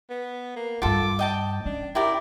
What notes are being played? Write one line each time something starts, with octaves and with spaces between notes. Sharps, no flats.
B3
A#3
G2 E4 F4 A4 D6
D#5 G5 A5
C#4 D4
E4 G4 A#4 D5